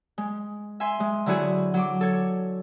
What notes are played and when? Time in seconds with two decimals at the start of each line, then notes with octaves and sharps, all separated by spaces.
0.18 G#3
0.80 E5 G#5 C6
1.00 G#3
1.26 D3 F#3 E4 F#4 G#4
1.74 F#3 D6
2.01 A4 C#5